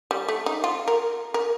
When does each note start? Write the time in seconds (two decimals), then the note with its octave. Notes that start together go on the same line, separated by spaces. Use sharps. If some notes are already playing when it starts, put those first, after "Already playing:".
0.11 G3
0.28 A3
0.46 D#4
0.64 F4
0.88 A#4
1.34 A#4